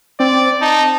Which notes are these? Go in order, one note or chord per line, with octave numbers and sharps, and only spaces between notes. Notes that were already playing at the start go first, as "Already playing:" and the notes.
C4 D5
D#4 A5